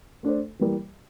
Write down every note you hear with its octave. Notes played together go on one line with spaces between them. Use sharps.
A3 D4 A4 C5
E3 G3 A#3